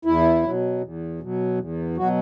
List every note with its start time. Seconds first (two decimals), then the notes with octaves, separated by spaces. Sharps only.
0.05 E2 E4
0.44 B2 F#3
0.82 E2
1.20 B2 F#3
1.58 E2
1.97 B2 F#3 F#4